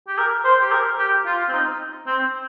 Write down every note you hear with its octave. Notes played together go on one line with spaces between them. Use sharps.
G4
A#4
C5
G4
A#4
G4
F4
C4
D#4
C4